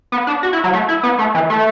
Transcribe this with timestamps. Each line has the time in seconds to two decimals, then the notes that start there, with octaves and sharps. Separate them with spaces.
0.12 B3
0.27 D4
0.43 F#4
0.53 E4
0.64 F#3
0.73 A3
0.88 E4
1.03 B3
1.19 A3
1.35 E3
1.50 A3